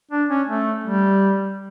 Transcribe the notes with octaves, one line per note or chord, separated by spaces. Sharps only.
D4
C#4
A3
G3